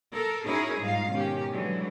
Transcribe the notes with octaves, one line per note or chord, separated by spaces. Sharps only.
A4 A#4
C#4 D#4 E4 F#4 G#4 A#4
G#2 G3 D#4 F4 F5
G#2 B2 D#3 C#4 G4
D3 E3 F#3 G#3